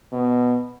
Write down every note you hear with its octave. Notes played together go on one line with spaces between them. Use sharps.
B2